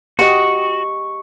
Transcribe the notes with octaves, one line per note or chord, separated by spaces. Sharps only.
F#4 G4 D#5 C#6